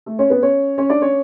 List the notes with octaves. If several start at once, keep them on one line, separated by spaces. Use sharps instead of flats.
A3 A4
C#4 C#5
B3 B4
C#4 C#5
C#4 C#5
D4 D5
C#4 C#5